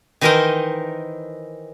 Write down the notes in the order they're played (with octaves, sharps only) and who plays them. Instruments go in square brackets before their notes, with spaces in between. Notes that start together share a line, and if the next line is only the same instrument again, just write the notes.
[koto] D#3 E3 D#4 A#4 C5 D#5